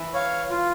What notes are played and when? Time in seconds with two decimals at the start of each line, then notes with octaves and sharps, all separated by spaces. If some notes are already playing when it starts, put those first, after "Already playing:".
Already playing: E3
0.14 C#5 F5
0.51 F4